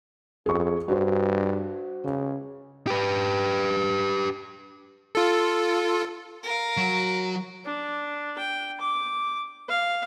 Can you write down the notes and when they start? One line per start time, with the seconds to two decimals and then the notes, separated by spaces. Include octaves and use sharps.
0.46 F2 G#4 C#6
0.88 G2 F#4 C5
2.04 C#3
2.87 G4 B4
5.15 F4 A4
6.43 A#4 F5
6.77 F#3 F#4
7.65 D4
8.38 G5
8.80 D6
9.69 F5